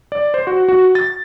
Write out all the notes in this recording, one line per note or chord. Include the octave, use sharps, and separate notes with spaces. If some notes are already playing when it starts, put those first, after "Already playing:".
D5
C5
F#4
F#4
A6